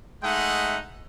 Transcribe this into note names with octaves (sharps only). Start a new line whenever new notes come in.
G#3 A3 D#4 E5 F#5